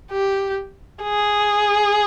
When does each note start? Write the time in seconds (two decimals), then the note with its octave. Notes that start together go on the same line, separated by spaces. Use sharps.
0.12 G4
1.04 G#4